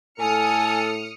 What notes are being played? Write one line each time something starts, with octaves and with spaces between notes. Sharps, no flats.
A2 A4 G#5 D#6 F6 C#7